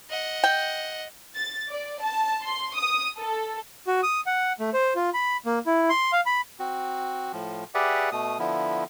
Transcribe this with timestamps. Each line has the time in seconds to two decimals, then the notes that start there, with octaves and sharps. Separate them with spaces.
0.10 D#5 F#5
0.44 G5
1.35 A6
1.68 D5
2.02 A5
2.43 C6
2.76 D#6
3.18 A4
3.87 F#4
4.03 D#6
4.26 F#5
4.60 A3
4.73 C5
4.96 F4
5.14 B5
5.46 A#3
5.66 E4
5.90 C6
6.12 F5
6.26 B5
6.59 C4 F#4
7.33 A2 F3
7.75 G4 G#4 B4 D5 E5 F#5
8.12 B2 A3 D#6
8.39 D3 F3 B3 E4